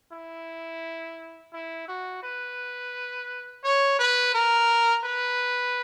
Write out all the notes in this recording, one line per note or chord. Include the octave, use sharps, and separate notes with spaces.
E4
E4
F#4
B4
C#5
B4
A#4
B4